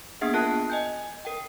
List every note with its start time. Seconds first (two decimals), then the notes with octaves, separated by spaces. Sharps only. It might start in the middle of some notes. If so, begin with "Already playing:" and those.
0.21 A#3 B3 D4 G#4 E5 F#5
0.34 F4 A#4 A5 F#6 C7
0.70 D#5 G#5 G6
1.25 A#4 G5